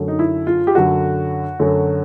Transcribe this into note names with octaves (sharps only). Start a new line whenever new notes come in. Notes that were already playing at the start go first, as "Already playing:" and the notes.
Already playing: F#2 D3 F#3 A3
D#4
E4
F4
G4
F#2 D3 F#3 A3 F#4
F#2 D3 F#3 A3